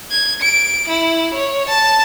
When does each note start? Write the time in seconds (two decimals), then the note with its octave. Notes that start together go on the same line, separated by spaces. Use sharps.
0.11 G#6
0.42 D7
0.88 E4
1.34 C#5
1.69 A5